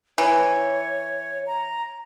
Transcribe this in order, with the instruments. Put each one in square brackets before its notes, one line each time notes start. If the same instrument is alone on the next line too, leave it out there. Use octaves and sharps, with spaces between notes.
[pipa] E3 [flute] C#5
[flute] A#5